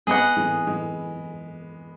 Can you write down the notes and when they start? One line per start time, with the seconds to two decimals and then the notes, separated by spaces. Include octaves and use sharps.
0.07 G#3 B3 G#4 D#5 F#5
0.37 E3 G#3
0.66 E3 G#3